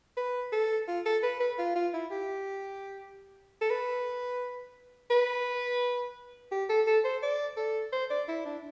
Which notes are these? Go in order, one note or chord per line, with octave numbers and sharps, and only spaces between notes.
B4
A4
F4
A4
B4
B4
F4
F4
E4
G4
A4
B4
B4
G4
A4
A4
C5
D5
A4
C5
D5
E4
D4